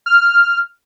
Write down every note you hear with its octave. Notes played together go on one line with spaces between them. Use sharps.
F6